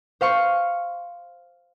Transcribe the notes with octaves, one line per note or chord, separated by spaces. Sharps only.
C5 F5 C#6